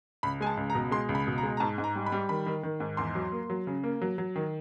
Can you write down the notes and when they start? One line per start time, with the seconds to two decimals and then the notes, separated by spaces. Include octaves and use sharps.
0.23 C#2 B5
0.41 G#3 G#5
0.47 A5
0.57 C#2
0.70 A#5
0.75 B2
0.91 G#3 C6
1.09 C#2
1.15 B5
1.27 B2
1.38 A#5
1.43 G#3
1.57 A#5
1.60 G#2 A5
1.78 G#2
1.84 A#5
1.96 G3
2.06 B5
2.12 G3
2.29 D#3 B5
2.46 D#3
2.63 D#3
2.80 G#2
2.97 E2 C6
3.15 F#3
3.32 A#3
3.50 F#3
3.67 C#3
3.83 A#3
4.01 F#3
4.18 F#3
4.36 D#3